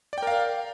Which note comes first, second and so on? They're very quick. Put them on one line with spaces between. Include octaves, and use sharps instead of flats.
D5 G5 A#4 F5